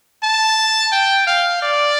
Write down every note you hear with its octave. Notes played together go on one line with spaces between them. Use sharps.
A5
G5
F5
D5